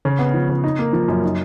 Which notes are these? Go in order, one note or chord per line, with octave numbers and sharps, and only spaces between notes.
C#3
B3
F3
C#3
D#4
A#3
F3
F#2
D#4